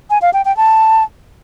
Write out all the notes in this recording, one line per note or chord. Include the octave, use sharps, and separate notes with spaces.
G#5
F5
G5
G5
A5